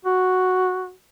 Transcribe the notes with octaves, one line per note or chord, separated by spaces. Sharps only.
F#4